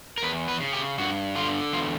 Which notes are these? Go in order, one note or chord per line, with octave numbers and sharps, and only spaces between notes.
A#4
E2 B4
B4
C#3
G4
G2 F#4
D3 F4
E2 F4